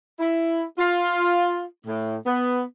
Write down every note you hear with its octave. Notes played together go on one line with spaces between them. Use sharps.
E4
F4
A2
B3